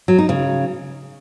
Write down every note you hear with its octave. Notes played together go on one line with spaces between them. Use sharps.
F#3
D#4
C#3